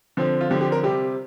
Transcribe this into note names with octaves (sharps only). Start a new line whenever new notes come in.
D3 F3 C4
F4
D3 F3 C4 G4
G4
A#4
C3 G3 C4 G4